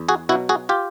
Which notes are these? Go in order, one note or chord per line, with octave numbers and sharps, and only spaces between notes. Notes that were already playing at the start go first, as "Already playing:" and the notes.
Already playing: E2
F#4 G#4
B2 F#3 E4 F#4
F#4 G#4
F4 G4